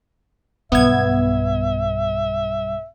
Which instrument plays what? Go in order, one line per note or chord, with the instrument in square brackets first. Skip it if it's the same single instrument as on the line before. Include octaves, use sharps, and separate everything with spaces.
[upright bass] B1 G2 [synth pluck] B3 G#6 [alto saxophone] E5